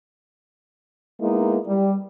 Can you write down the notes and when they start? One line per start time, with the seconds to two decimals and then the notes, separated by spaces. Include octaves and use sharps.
1.21 G#3 A#3 B3 D#4 E4
1.66 G3